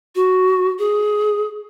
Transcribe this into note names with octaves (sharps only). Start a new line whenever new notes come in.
F#4
G#4